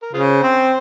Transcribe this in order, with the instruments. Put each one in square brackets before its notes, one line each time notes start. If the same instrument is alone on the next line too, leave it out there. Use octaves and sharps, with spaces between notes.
[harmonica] A#4
[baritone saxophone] C#3 [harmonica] F4 G#4 C5
[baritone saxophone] C4